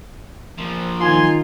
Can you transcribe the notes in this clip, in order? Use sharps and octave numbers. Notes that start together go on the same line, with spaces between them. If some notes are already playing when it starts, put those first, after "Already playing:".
A#2 F3
D#3 D#4 F4 G#5 C6